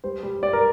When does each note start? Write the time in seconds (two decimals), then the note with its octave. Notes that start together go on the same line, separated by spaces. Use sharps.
0.04 G3 C5
0.23 G3
0.42 G3 D5
0.53 A#4